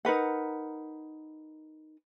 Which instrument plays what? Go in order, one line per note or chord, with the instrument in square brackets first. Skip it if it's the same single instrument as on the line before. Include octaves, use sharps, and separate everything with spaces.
[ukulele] D#4 A#4 B4 F#5